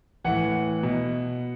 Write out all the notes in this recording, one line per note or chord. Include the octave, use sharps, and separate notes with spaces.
A2 E3 F#5
B2